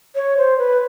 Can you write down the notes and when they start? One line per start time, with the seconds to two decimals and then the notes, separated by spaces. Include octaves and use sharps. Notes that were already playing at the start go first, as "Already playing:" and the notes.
0.15 C#5
0.37 C5
0.58 B4